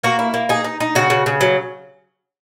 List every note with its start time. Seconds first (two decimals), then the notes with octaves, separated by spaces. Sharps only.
0.03 A#3 F#4 A#4
0.19 E4
0.34 A#3
0.49 D#4 G#4
0.64 D#4
0.80 D#4
0.95 C#3 F#4
1.10 C#3
1.26 C#3
1.41 F#3